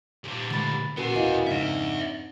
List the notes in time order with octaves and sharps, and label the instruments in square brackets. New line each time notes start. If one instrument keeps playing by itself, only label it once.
[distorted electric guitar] A#2 G3
[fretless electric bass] D3 G#3 A3 [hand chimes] B5 A6
[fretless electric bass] A#2 [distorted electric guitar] B3 G#5 [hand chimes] C#4 F#4 A#4
[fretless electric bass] F#1 B1 E2 [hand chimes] E4 D#5 F5
[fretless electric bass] F2 G#2 C#3 [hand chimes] C4 D4 D#4 [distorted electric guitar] D5 E5